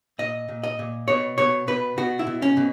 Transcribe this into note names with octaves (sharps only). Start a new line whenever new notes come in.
A#2 D#5
A#2
D#5
A#2
B2 C#5
B2 C#5
B2 B4
B2 F#4
E4
B2
C#4
B2